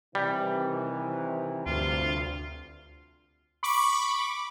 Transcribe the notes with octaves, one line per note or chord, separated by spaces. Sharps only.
C3 D#3 E3 G3
D2 G2 C3 F4
B5 C#6 D6